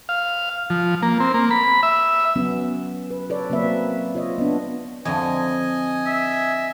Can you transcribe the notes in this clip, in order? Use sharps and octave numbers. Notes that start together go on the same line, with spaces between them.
F5
F3
A#3
C4
A#3
B5
E5
F#3 B3 C#4
B4
A4 B4 C#5 D5
F#3 A#3 C4 B4 E5
F4 C#5 D#5
B3 D4
F2 D3 F3 D#5 G#5
E5